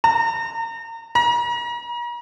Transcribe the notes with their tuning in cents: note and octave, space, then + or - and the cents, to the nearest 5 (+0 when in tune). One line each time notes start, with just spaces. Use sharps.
A#5 -30
A#5 +45